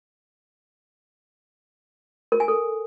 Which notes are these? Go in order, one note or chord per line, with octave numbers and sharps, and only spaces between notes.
A#4
G#5
A4